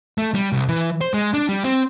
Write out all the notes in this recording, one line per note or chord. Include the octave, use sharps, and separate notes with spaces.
A3
G3
C2
E3
C5
G#3
D4
G3
C4